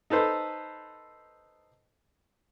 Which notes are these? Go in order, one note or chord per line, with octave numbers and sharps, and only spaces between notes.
D#4 A4 B4 C5